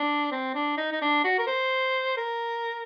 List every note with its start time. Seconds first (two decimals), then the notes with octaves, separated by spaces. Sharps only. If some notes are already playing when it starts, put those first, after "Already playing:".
Already playing: D4
0.31 C4
0.55 D4
0.77 D#4
0.92 D#4
1.02 D4
1.24 F#4
1.39 A#4
1.47 C5
2.17 A#4